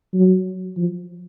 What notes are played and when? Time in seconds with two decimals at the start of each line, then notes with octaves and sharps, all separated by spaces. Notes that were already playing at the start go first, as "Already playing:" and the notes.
0.14 F#3
0.77 F3